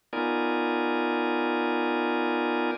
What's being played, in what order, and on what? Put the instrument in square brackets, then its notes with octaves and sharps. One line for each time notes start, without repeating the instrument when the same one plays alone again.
[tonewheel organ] B3 D#4 F4 A#4 D5 G#5